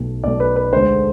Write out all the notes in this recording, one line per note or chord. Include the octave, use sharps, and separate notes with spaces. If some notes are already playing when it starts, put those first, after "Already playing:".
Already playing: B1 B2 A3
B1 B2 A3 D5
B4
B4
D2 D3 G#3 C5